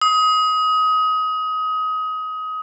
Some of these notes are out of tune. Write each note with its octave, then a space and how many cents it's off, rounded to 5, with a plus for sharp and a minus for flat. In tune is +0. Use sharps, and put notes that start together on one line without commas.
D#6 +25